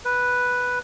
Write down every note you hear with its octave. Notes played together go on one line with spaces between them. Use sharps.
B4